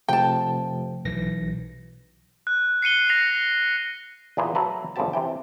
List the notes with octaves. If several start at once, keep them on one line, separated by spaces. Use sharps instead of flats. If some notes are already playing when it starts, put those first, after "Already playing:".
C3 F3 A3 G5 A5
B1 E3 A#6
F#6
C7 C#7 D#7 G7
A#6 C7 F7
E2 A#2 B3 G#4
F#3 A3 A4 B4
G1 C#3 G3 C4 G4 A5
C3 E3 G5